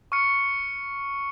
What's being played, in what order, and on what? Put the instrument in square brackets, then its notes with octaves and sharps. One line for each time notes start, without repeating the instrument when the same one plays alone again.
[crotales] C#6 F6 C#7